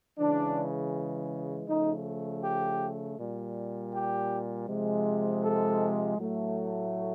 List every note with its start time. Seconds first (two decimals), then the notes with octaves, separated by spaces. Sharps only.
0.18 C#3 E3 G#3 D4
1.68 C#3 F3 A3 D#4
2.44 G4
3.19 A#2 G3
3.94 G4
4.68 C3 F3 G#3
5.44 A4
6.17 A2 F#3 A3